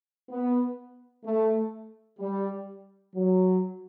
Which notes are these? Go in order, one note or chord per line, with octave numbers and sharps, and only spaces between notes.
B3
A3
G3
F#3